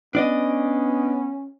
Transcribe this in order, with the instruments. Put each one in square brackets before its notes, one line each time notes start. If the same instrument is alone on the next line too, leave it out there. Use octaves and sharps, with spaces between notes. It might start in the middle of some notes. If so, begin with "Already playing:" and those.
[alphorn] B3 [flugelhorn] C#4 [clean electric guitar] D4 D5 D#5